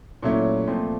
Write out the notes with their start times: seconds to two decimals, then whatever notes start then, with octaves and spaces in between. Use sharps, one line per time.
0.23 A#2 F#3 A3 C#4 E4
0.68 A#2 F3 A3 C4